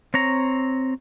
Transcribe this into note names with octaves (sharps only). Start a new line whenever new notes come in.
C4 C#5 A#5